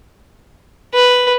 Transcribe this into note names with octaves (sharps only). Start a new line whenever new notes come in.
B4